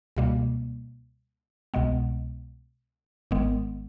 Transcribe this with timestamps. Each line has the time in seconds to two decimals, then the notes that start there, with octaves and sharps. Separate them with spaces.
0.17 C#2 B2 G3 A#3
1.74 C2 B2 G#3 B3
3.31 G#1 G#2 D#3 G#3 B3